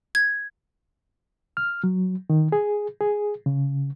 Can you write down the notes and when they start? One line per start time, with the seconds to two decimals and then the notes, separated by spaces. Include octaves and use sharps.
0.15 G#6
1.57 F6
1.84 F#3
2.30 D#3
2.52 G#4
3.01 G#4
3.46 C#3